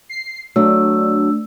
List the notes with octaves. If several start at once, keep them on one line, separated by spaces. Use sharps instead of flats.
C7
F#3 A3 D4 E6